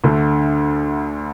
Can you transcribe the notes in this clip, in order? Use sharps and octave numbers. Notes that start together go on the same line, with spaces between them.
D2 D3 A3